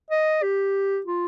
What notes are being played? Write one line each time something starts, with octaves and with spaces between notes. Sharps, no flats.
D#5
G4
F4